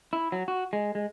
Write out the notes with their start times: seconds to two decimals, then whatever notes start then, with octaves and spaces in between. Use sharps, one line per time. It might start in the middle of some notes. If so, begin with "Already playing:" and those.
0.13 E4
0.32 F#3
0.48 F#4
0.73 G#3
0.95 G#3